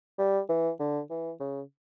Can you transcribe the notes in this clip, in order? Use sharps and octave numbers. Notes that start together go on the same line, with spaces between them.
G3
E3
D3
E3
C#3